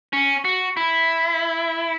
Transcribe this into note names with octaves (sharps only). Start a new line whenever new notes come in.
C#4
F#4
E4